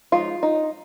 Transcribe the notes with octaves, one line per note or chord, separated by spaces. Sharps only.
F3 G#3 D#4 F4
D#4